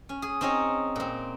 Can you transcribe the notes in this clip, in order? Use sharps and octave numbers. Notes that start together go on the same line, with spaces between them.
C#4
G#4
C4 C#4 D#4 G#4 C#5
A#2 C4